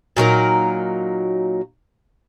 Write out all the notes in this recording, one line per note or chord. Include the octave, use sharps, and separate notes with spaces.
A#2 F#3 D#4 A#4